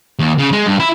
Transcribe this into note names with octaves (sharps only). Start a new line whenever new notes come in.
D#2
C#3
G#3
G2
E4